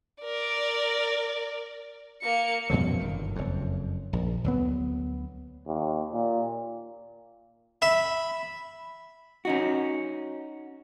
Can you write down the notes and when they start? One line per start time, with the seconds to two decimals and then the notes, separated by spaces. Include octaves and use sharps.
0.22 A#4 D5
2.22 A#3 C#7
2.70 F#2 B2 F3 F#3
2.99 G1 D#3
3.36 F#1 F2
4.13 A#1
4.44 D2 F#3 B3
5.67 D#2
6.12 A#2
7.82 E5 B5
9.45 C#4 D#4 F#4